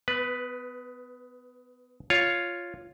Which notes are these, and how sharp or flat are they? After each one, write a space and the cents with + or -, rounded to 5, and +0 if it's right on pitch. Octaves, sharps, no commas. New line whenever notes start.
B3 +25 B4 -5
F4 +0 C#5 +5